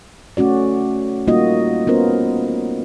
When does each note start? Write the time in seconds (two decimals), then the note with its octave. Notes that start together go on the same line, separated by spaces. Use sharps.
0.37 A3 C#4 F#4 D5
1.27 G3 A#3 D#4 F4 F#4 D#5
1.87 B3 C#4 F4 A#4 C5